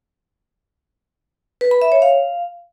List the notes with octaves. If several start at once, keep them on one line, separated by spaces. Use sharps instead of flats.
B4
B5
E5
C#5
F5